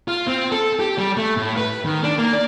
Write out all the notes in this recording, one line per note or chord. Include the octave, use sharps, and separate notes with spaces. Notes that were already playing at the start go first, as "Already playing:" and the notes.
F4
C4
A4
G4
G3
A3
A2
B4
D#3
D4
A#3
D5